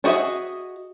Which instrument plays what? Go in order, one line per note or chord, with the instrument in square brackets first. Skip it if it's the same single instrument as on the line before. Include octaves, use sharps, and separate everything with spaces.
[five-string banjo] D4 F#4 G#4 D#5 E5